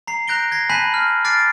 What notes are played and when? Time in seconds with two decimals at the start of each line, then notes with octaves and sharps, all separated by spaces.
0.07 A#5 C7
0.28 A#5 F#6 G6 A#6 D7 G7
0.52 G#6 A#6 C7
0.70 G#5 A5 B5 F#6 G6 B6
0.94 F6
1.24 D6 F6 A6 C7 D7